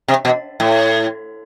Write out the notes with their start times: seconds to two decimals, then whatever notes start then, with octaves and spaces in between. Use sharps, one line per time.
0.08 C3
0.25 B2
0.60 A2